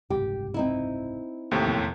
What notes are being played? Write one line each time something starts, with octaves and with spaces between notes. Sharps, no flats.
F#1 C2 G#2 G4
C4 D#4 E4
D#2 A2 C3
E1 F3 B3